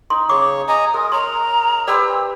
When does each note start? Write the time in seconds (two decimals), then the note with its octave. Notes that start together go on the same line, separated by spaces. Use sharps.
0.10 D#4 C6
0.29 C#3 C#5 C#6 D6
0.68 D#5 G#5 A#5 D#6
0.94 G#3 A#4
1.12 C#5 A#5 C6
1.88 G4 B4 C5 D5 E6